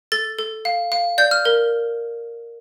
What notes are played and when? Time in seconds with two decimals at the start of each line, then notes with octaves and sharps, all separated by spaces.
0.12 A4 A6
0.39 A4
0.65 F5
0.92 F5
1.18 D5 G6
1.31 F6
1.45 A#4